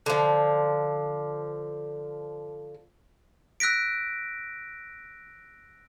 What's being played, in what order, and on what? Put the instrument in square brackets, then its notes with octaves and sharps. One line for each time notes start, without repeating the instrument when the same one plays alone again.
[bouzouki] D3 F3
[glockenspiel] E6 F#6 A#6 B6 D7